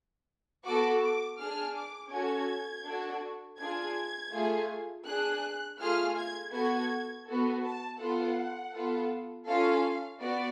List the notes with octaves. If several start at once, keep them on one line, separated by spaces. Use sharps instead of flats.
B3 F#4 A4 D6
D6
D4 G#4 F6
D6
C#4 F#4 A4 G#6
D4 F#4 A4
D4 F4 G#4 G#6
A3 F4 G#4
D4 G#4 F#6
A3 F4 G#4 F6
G#6
B3 F#4 A4 G#6
B3 F#4 A4
A5
B3 F4 A4 F#5
B3 F4 A4
C#4 F4 A4 F5
B3 F#4 D5